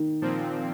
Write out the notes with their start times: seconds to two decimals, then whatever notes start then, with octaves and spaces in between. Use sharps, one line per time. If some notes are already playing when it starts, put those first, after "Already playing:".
Already playing: D#3
0.21 A#2 F3 C4